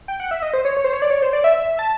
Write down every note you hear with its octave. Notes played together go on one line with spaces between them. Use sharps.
G5
F#5
E5
D#5
C5
C#5
C#5
C5
C#5
D5
C#5
C5
D5
E5
A5